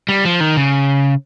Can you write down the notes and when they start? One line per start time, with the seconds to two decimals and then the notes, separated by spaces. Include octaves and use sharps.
0.09 G3
0.25 F3
0.40 D#3
0.57 C#3